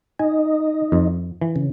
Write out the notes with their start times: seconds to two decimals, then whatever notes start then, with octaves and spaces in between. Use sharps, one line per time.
0.19 D#4 G#5
0.92 F2
1.42 E3
1.56 C#3